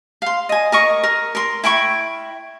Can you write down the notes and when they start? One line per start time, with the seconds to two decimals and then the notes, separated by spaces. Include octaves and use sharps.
0.22 F5 C6
0.49 D#5 G#5
0.72 A#4 D#5 C#6
1.03 A#4
1.35 A#4 C6
1.64 E4 G5 B5 C#6